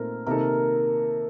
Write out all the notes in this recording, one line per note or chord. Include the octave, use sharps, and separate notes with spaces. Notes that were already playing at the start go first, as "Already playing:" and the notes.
Already playing: A#2 A3 C4 D#4 A4 A#4
C3 D#3 A#3 D#4 A4 A#4